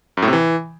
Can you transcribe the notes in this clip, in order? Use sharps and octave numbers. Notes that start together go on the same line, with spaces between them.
F#2
A2
C3
E3